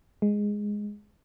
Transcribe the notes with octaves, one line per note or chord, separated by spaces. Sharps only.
G#3